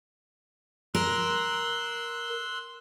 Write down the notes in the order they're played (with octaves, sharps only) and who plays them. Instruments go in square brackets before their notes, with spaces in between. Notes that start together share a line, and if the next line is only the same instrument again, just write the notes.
[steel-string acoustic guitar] A#4 [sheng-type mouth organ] C6 E6 F#6